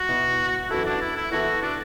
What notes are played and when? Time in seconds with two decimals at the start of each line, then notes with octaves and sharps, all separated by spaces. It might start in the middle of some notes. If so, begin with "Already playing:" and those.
Already playing: F#4
0.09 B2 B3 E4
0.70 F#2 E3 B3 E4 F#4 A4
0.85 D4
1.01 E4
1.16 E4
1.31 E3 B3 E4 F#4 A4
1.62 D4